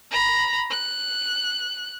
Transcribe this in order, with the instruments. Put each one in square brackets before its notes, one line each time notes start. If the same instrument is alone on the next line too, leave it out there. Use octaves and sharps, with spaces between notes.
[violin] A#5 B5
F#6